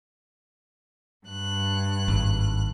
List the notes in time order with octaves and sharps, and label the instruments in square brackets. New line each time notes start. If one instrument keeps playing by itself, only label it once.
[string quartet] G2 F#6
[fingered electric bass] G#1